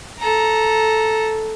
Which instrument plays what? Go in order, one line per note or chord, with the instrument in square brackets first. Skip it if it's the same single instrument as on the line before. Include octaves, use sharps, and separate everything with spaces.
[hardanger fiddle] A4 A#5